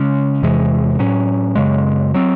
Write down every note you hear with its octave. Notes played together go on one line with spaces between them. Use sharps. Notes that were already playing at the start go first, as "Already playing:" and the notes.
Already playing: C#3 G#3 C#4
E2 C3 E3 G#3
A2 F#3 C#4
F#2 C#3 G#3
F#3 C4